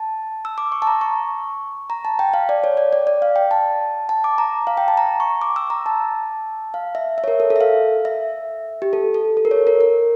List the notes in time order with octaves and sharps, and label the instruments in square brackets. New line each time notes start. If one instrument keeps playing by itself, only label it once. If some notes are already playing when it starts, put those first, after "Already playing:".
Already playing: [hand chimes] A5
E6
D6
C#6
A5
A#5
C#6
A#5
A5
G5
F5
D5
C#5
D5
D5
D5
F5
G5
A5
A5
D6
A#5
F5
G5
A5
A#5
C#6
D6
E6
A#5
A5
F5
E5
E5
C#5
A#4
A4
A4
E5
F5
E5
G4
A4
A4
A4
A#4
C#5
A#4
A#4